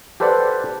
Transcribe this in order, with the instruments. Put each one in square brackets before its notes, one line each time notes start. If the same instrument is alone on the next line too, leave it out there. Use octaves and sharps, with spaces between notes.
[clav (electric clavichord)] G4 A4 B4 C5 D5 F#5